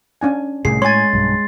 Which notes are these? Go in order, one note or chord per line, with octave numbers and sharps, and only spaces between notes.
C#4 D4 G#5
C2 A2 G#4 C7
G#3 C#5 G#5 C6 A6
B1 G2